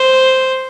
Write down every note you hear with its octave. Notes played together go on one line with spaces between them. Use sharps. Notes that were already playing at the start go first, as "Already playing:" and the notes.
Already playing: C5